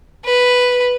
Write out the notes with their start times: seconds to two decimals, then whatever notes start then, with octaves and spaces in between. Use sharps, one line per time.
0.25 B4